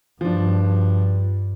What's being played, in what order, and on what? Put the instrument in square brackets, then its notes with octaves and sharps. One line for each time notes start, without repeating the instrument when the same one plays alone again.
[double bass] G2 [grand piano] F3 D4